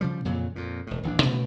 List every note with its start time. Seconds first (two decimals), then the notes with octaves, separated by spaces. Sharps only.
0.01 C#3 F3 G3
0.25 F2 A#2 C#3 F#3
0.56 F2 A#2
0.87 E1 A2
1.03 D#1 A#1 E3 D4
1.23 A#2 C#3 A3